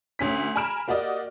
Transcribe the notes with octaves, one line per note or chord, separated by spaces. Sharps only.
D2 C#4 B6
G#5 A#5 B5 F6 D7 E7
A#3 F#4 G4 D5 D#5